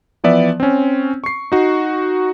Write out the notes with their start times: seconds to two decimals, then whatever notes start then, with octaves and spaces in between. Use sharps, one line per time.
0.24 E3 F3 B3 D5 E5
0.60 C4 C#4
1.24 C#6 C7
1.52 D#4 F#4